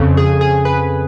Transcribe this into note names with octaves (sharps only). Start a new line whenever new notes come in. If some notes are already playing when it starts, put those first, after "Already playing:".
Already playing: F2 C#3
G#4
G#4
B4